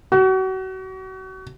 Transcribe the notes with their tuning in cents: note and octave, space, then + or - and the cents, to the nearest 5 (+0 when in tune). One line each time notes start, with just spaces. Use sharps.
F#4 +35